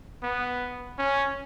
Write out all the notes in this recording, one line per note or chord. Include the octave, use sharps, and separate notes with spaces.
B3
C#4